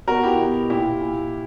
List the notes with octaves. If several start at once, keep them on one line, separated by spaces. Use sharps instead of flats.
B2 F#4 A#4
E4 G4
B2
A#2 E4 G4
A#2